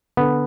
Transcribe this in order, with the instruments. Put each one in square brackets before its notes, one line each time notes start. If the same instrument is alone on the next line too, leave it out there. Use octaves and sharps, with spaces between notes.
[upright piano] D3 [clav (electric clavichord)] B3